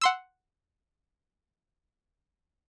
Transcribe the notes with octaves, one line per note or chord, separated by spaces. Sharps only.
F#5 C6 E6